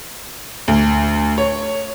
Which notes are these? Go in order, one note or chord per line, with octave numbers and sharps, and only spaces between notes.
D2
C#5